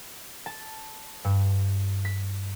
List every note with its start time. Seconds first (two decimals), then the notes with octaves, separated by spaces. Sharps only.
0.46 A5
1.25 G2
2.05 B6